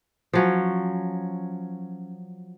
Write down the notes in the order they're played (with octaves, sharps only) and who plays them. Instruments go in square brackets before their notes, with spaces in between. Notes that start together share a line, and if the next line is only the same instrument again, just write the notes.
[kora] F3 F#3 C#4